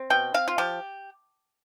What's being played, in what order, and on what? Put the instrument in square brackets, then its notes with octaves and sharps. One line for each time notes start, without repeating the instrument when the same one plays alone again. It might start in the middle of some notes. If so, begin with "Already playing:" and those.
Already playing: [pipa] C4
B2 G5
C4 F5
F4
F3 G4